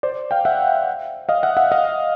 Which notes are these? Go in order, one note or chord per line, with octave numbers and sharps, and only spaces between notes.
C5 D5
F5 G5
E5 F#5
D#5 F5
E5 F#5
E5 F#5
D#5 F5